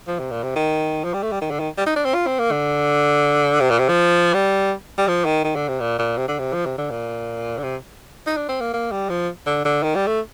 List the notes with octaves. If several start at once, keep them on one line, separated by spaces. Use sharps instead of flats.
F3
C3
A#2
C3
D#3
F3
G3
A3
G3
D#3
D3
D#3
G3
D#4
D4
C4
F4
C4
A#3
D3
C3
A#2
C3
F3
G3
G3
F3
D#3
D#3
D3
C3
A#2
A#2
C3
D3
C3
F3
C3
D3
A#2
D3
C3
D#4
D4
C4
A#3
A#3
G3
F3
D3
D3
D#3
G3
A3